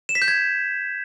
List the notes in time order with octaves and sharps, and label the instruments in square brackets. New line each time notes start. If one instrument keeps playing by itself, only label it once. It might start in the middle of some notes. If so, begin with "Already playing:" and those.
[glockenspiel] E7
B6
G6
G#6